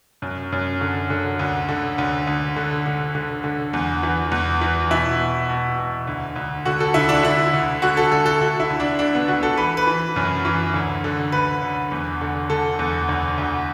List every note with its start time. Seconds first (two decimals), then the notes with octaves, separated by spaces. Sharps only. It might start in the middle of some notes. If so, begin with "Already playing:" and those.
0.22 F#2
0.52 F#2
0.81 D3
1.10 D3
1.39 D2
1.69 D3
1.98 D2
2.27 D2
2.57 D3
2.86 D3
3.15 D3
3.44 D3
3.73 E2
4.03 E3
4.32 E2
4.61 E3
4.91 B2 E4
5.20 B2
5.49 B2
5.78 B2
6.07 D2
6.36 D2
6.65 D3 F#4
6.80 A4
6.94 D2 E4
7.09 D4
7.23 D3 E4
7.53 D2
7.82 D3 F#4
7.97 A4
8.12 D3 A4
8.26 A4
8.40 D3 F#4
8.60 E4
8.70 D2
8.80 D4
8.99 D3 D4
9.14 B3
9.28 D2 F#4
9.43 A4
9.57 E3 B4
9.77 B4
9.87 E3
10.16 F#2
10.45 E3
10.74 D2
11.04 D3
11.32 D2 B4
11.62 D2
11.92 E2
12.21 D3
12.50 D3 A4
12.79 E2
13.09 D2
13.38 D2